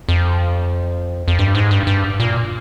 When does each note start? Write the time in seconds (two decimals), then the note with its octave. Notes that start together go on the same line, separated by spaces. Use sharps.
0.09 F2
1.28 F2
1.39 G2
1.55 G#2
1.71 G2
1.87 G2
2.20 A#2